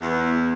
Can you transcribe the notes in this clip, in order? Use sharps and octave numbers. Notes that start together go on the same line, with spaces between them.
E2